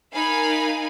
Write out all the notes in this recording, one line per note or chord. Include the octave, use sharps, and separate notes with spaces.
D#4 A#4 F5 G#5 B5